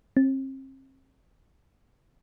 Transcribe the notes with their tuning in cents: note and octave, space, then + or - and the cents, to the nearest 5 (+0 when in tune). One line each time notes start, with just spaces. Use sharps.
C4 +35